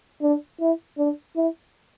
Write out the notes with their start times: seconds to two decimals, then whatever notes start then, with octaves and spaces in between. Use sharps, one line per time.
0.22 D4
0.60 E4
0.98 D4
1.36 E4